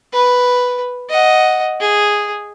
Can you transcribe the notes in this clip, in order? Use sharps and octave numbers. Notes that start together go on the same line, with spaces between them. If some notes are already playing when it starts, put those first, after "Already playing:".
B4
D#5 F#5
G#4